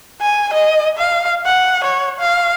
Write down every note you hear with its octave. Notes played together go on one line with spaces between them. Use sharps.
G#5
D#5
F5
F#5
C#5
F5